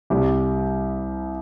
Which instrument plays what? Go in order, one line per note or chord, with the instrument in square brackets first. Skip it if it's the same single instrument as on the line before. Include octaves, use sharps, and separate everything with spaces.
[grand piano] C2 C3 G3 G4